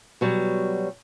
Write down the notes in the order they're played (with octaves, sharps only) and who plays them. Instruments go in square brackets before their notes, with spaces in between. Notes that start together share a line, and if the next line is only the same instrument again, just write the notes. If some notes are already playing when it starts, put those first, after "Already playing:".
[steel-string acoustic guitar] B2 F#3 G3